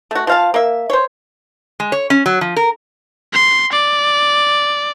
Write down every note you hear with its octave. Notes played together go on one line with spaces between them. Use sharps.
A3 F#4
F3 F5 A5
A#3 E5
C5 C#5
G#3
C#5
C#4
F#3
F3
A#4
C6
D5